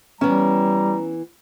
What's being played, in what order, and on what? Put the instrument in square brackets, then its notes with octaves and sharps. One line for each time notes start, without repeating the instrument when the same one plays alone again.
[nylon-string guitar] E3 B3 [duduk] G3 [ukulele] C#4 [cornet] A#5